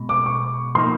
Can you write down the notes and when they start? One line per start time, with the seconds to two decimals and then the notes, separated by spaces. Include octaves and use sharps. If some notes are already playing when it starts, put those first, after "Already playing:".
Already playing: B2 G#3
0.09 D6
0.26 C#6
0.75 F3 A#3 D#4 C6